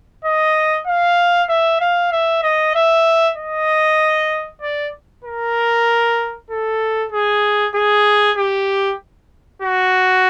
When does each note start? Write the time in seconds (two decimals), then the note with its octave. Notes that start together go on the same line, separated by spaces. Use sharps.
0.25 D#5
0.87 F5
1.49 E5
1.81 F5
2.12 E5
2.43 D#5
2.75 E5
3.37 D#5
4.62 D5
5.25 A#4
6.50 A4
7.12 G#4
7.75 G#4
8.38 G4
9.62 F#4